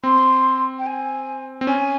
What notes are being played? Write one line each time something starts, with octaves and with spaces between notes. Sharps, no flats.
C4 C6
G5
G#5
C4
C#4 G#5